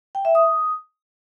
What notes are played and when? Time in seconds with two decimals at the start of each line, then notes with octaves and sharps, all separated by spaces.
0.15 G5
0.25 E5
0.35 D#6